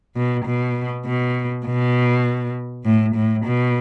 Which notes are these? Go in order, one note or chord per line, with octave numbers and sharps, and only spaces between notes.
B2
B2
B2
B2
A2
A2
B2